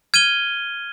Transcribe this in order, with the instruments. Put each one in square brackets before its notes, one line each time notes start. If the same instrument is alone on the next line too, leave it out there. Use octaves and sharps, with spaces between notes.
[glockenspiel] F6 G#6 D#7 G7